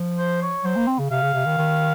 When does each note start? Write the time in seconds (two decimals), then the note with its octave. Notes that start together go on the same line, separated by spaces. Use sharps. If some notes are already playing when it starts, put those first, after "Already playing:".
Already playing: F3
0.18 C5
0.42 C#5
0.64 F#3 C5
0.76 A#3
0.87 C4
0.99 C#3
1.10 C3 F5
1.22 C#3
1.33 C3
1.45 D#3
1.57 D#3